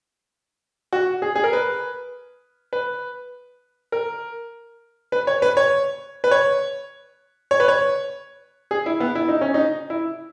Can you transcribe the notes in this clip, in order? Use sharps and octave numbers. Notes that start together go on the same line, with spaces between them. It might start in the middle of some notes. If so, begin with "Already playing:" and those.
F#4
G#4
G#4
A#4
B4
B4
A#4
B4
C#5
B4
C#5
B4
C#5
C#5
B4
C#5
G#4
E4
B3
E4
D#4
C#4
D#4
E4